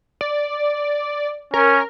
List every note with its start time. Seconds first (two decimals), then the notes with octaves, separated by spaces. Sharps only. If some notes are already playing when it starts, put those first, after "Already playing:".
0.21 D5
1.54 C#4 A#4